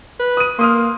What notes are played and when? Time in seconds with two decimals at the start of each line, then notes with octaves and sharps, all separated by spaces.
0.20 B4
0.37 D#6 D#7
0.59 A#3 C6 D#6 F6